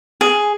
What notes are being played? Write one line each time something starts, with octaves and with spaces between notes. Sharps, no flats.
G#4